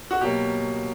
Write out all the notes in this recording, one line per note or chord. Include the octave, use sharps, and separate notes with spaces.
F#4
B2 F#3 A#3 G4